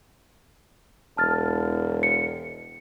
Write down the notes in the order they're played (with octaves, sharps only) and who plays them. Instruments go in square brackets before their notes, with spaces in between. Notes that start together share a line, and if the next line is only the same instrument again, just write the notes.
[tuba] E1 [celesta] A5 F6 A6
[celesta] C#7